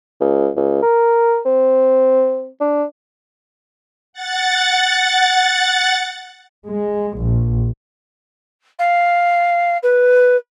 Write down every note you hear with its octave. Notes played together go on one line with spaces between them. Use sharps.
C#2
C#2
A#4
C4
D4
F#5 A6
G#3
A#1
F5
B4